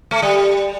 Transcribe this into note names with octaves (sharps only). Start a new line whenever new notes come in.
A3
G3